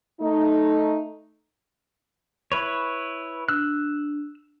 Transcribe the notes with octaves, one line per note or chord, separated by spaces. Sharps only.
A3 D#4
E4 B4 C#5
D4 E6 F#6